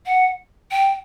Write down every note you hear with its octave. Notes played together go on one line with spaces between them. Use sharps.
F#5
G5